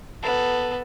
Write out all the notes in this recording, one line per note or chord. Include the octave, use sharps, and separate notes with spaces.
B3 A4